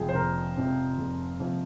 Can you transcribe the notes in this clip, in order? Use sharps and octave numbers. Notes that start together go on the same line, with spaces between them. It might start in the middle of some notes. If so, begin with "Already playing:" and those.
Already playing: F1 F2 C3 F3 G#4 G5
C5
F1 A#4
F2 C3 F3
F1
F2 C3 F3